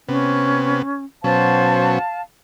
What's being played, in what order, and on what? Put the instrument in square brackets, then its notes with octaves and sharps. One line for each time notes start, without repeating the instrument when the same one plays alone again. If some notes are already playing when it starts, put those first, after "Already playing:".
[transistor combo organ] C3 B3 [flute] C#4
[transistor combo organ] B2 F#3 C#4 [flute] C5 [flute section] F5 A5